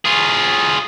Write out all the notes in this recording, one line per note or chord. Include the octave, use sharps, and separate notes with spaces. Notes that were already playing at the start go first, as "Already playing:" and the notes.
F4 G#4